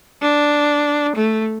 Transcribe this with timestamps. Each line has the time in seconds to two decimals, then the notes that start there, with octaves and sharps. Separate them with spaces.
0.22 D4
1.15 A3